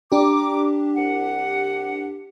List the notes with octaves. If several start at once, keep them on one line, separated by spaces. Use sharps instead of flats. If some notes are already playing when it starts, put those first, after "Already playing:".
D4 G4 A#5 D6
C2 F#5